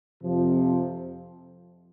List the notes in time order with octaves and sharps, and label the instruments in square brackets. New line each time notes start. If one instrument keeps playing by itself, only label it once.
[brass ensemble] F2 C3 F3